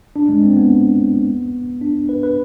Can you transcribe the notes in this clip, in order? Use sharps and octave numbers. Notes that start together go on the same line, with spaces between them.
D4
G#3
C4
B3
D4
B4
B4